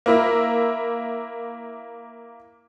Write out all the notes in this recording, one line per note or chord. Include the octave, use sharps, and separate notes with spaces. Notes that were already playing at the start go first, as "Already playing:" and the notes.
A#3 E4